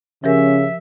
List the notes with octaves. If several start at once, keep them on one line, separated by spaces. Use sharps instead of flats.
C#3 F3 C#4 G4 A#4 E5